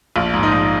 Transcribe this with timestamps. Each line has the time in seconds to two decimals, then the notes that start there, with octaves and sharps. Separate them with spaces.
0.16 A#1 F4
0.34 G#2
0.43 D#4
0.52 A#1